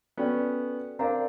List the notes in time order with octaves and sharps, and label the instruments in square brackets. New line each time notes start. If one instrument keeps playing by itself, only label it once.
[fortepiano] B3 C#4 [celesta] F#4 A4 D5 G5
[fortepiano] C4 D4 [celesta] A#4 D5 F5 A#5